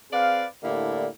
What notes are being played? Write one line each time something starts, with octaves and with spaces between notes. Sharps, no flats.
C4 G#4 B4 D5 F5
A2 D3 A#3 E4 G4 D5